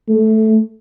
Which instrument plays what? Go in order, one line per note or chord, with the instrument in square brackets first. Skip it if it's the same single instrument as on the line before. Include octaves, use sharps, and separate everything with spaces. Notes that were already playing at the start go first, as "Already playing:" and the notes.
[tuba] A3